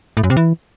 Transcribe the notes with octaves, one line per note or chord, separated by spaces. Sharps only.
A2
F#2
C3
E3